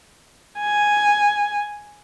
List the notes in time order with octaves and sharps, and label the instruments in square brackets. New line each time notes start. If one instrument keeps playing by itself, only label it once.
[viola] G#5